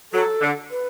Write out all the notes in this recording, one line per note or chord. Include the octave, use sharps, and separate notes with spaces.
F#3 A4
D3
B4